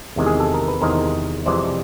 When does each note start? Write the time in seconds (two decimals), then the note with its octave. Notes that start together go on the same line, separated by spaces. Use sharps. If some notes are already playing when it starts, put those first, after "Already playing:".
0.16 E2 C3 D#3 G#3
0.26 G#4
0.40 A4
0.54 A#4
0.68 B4
0.81 E2 C3 D#3 G#3 A#4 C5
1.46 F2 C3 E3 G#3 C5 D5